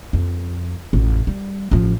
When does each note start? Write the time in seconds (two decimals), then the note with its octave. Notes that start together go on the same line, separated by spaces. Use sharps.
0.13 F2
0.93 A1 F2
1.27 G3
1.71 A1 F3